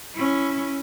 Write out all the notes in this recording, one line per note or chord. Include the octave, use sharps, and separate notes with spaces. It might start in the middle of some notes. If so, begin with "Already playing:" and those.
C#4 E4